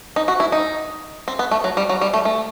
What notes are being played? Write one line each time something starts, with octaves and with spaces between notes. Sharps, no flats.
D#4
F#4
E4
D#4
C4
B3
A3
F#3
G3
F#3
G3
A3
A3